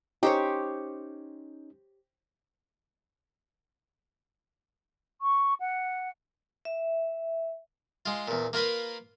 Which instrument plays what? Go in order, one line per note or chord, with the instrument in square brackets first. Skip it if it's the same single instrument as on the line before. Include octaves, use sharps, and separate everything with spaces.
[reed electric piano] C#4 D#4 [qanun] G4 C5 C#5
[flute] C#6
F#5
[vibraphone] E5
[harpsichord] G#3 F4
E2 A#2
A#3 F4 A#4 B4